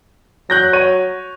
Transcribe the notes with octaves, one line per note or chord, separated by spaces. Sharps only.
F#3 F#6 G6 A#6
C#5 D#7